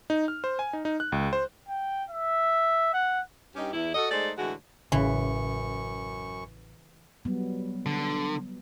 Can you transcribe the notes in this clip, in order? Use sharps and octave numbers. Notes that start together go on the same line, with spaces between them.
D#4
F6
C5
G#5
D#4
D#4
F#6
C#2
C5
G5
E5
F#5
G2 C#4 D#4 G4
E2 E4
F#4 A4 D#5
G#3 A3 D#4 G#4 C5 D5
A2 D3 E3 G#3 F#4
A1 F#2 C#3 E3 C#6
F#3 G3 B3
D3